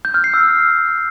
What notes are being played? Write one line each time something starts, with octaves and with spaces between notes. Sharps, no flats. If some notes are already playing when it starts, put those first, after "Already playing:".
G6
F6
C7
E6
F6